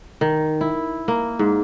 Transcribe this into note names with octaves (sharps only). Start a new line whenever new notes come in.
D#3
E4
A#3
G#2